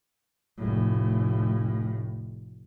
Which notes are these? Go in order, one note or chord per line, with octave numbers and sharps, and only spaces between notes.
F1 A2